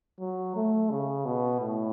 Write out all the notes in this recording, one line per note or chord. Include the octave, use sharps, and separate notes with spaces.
F#3
A3
C#3
B2
A2